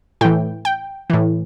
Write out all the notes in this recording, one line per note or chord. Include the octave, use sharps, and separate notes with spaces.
A2 E3 G5
G5
A2 E3